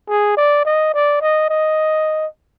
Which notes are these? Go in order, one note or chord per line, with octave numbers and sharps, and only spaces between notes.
G#4
D5
D#5
D5
D#5
D#5